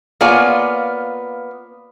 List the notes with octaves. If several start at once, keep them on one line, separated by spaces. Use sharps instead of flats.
A#3 B3 F4 C#5 D5 G#5